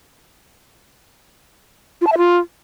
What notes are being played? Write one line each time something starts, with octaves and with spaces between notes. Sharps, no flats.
F4
A5
E5
F4